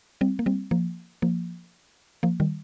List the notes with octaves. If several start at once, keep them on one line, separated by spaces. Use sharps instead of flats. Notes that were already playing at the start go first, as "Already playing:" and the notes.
G3 C4
A#3
G3 C4
F3 A#3
F3 A#3
F3 A#3
D#3 G3